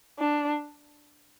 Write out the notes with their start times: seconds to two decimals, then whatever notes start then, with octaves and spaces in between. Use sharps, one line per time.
0.20 D4